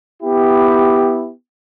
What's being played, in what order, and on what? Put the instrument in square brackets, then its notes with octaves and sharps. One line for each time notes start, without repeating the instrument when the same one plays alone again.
[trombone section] B3 E4 G4